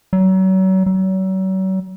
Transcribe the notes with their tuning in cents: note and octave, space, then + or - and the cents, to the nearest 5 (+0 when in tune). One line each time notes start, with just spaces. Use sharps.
F#3 +35
F#3 +40